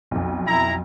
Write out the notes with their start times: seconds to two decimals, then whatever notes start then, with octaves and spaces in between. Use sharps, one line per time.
0.11 B1 F2
0.47 E4 A#5